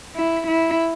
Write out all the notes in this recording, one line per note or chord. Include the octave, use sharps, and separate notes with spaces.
E4
E4